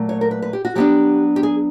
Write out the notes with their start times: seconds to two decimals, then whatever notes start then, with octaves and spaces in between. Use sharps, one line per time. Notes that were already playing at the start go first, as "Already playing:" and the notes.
Already playing: A#2 F#3 A3
0.09 C#5
0.21 A#4
0.31 B4
0.42 B4
0.53 G4
0.65 F#4
0.75 F#3 B3 D4 G4
1.36 G4
1.43 G#4